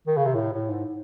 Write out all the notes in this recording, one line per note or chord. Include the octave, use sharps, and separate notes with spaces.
D#3
C#3
C3
A2
A2
G#2